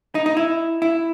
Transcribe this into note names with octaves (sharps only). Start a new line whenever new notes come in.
D#4
D#4
E4
E4